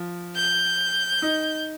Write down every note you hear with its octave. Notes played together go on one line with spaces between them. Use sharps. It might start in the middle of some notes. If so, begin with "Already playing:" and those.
Already playing: F3
G6
D#4